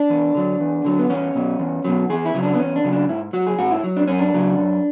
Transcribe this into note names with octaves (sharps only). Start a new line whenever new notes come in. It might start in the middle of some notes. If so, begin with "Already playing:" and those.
Already playing: D4
E2
D3 F#3
E2
D3 F#3
B3
E2 C#4
B2 F#3
E2
B2 F#3
E2 G#4
E4
C#3 F#3
D4
B3
E2 C#4
D4
C#3 F#3
D4
G#2 E4
F#3 F#4
G#4
G#2 F#4
E4
F#3
D4
F#2 C#4
D4
C#3 F#3
F#2